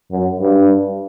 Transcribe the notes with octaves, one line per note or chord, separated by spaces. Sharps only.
F#2
G2